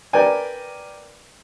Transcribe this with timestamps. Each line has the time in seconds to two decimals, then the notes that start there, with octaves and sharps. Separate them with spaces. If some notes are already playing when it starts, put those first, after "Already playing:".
0.13 A#4 B4 D5 G5 G#5